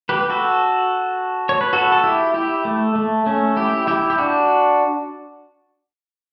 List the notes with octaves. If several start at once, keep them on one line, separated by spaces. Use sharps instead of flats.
G4 B4
F#4 A4
C#5
B4
F#4 A4
A4
E4 G4
E4 G4
A3
A3
A3 C#4
E4 G4
E4 G4
G4
D4 F#4